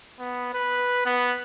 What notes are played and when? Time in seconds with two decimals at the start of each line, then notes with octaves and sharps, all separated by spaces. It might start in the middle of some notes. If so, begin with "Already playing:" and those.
0.20 B3
0.53 B4
1.05 B3